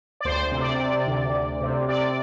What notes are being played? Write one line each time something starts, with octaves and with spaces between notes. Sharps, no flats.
D5
D2 C5
C3
D5
C3
D2
D2
C3
C3 D5